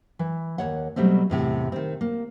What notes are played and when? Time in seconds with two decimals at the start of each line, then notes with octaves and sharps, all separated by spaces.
0.19 E3
0.58 D#2 C#5 F#5
0.96 B2 F#3 G3 A3 C4
1.30 E2 A2 C3
1.72 D#3 C4
2.01 A#3